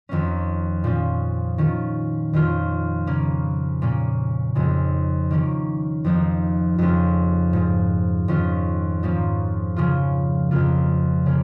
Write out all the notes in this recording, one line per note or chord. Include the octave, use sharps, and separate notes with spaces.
F2 D#3 A#3 C#4
A#2 F3 C#4 F4
D#3 C#4 F4
F2 D#3 C#4 F4
C#3 A#3 C#4
A#2 A#3 C#4
F2 C#3 G#3 D#4
D#3 A#3 C#4
F2 F3 A#3 D#4
F2 C#3 G#3 C#4 F4
G#2 G#3 F4
F2 D#3 C#4 F4
G#2 F3 A#3 C#4
C#3 F3 C#4 F4
F2 C#3 A#3 F4
C#3 A#3